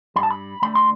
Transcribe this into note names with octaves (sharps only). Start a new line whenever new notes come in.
G2 B5
A5
B5
D3 A3 B5
C6